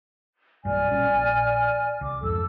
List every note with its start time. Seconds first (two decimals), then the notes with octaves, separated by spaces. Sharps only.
0.65 B1 G2 D5 G#5 F6
0.90 A#1 G3 C#4
1.14 A#1
2.01 C2 D6
2.23 F2 G#2 A4 E6